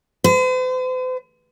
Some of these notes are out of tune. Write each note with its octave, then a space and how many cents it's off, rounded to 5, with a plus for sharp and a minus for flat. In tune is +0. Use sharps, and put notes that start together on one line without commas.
C5 -45